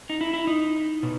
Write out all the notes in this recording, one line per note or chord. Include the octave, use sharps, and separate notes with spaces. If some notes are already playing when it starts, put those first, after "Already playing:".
D#4
E4
E4
D#4
B2